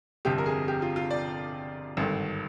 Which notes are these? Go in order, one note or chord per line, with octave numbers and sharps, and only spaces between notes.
G1 F2 C3 G4
A#4
G#4
G4
F4
F4
D5
G#1 G2 D3